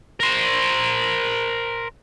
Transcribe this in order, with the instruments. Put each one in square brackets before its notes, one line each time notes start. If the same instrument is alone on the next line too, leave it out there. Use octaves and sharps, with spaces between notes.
[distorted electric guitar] A#4 C5